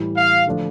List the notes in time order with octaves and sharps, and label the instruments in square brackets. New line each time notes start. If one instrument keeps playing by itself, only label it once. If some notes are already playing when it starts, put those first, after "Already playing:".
Already playing: [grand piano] A2 E3 G3
[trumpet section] F5
[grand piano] D3 F3 A3 D4